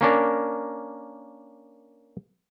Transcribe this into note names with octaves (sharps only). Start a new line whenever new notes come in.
A#3 C#4 D4 A#4